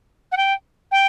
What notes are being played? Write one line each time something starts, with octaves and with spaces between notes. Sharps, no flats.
F#5
G5
G5